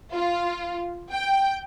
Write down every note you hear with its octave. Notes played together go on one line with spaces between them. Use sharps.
F4
G5